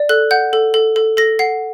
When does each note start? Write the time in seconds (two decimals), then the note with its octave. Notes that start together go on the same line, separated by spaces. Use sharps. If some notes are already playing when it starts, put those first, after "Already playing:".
Already playing: D5
0.09 A4 F#6
0.31 F#5 G6
0.53 A4
0.74 A4
0.96 A4
1.17 A4 A#6
1.39 F#5 C7